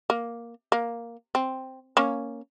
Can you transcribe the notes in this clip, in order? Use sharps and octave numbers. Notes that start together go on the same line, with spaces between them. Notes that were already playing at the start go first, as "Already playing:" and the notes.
A#3
A#3
C4
A#3 C#4